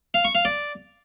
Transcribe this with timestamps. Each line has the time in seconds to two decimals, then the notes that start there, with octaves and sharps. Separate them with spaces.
0.14 F5
0.25 C#6
0.35 F5
0.45 D5